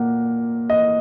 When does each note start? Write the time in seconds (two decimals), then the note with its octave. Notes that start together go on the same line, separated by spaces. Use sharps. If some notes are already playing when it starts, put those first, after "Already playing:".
Already playing: A#2 A#3 F#5
0.70 D#5